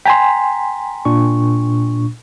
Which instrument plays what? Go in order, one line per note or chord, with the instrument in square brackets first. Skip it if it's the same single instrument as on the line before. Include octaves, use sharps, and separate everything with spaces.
[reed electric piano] G5 G#5 C6 [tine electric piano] A#5 B6
[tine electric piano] A#2 D4 C#6